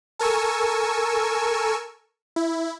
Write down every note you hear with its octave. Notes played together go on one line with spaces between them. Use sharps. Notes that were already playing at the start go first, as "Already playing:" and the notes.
A4 A#4 G#5 C#6 E6
E4